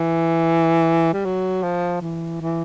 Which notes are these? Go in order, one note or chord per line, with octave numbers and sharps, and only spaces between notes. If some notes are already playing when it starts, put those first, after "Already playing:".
Already playing: E3
G3
F#3
F3
E3
E3